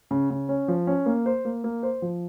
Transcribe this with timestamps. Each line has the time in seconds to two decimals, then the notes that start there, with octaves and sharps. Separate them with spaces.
0.11 C#3
0.30 C#3
0.49 C#4
0.68 F3
0.87 C#4
1.06 A#3
1.26 C5
1.45 A#3
1.64 A#3
1.83 C5
2.02 F3